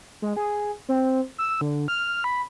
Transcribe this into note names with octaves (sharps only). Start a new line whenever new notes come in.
G#3
G#4
C4
E6
D3
F6
B5